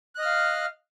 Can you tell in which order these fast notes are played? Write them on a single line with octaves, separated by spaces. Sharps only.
F#6 D#5 F6 F5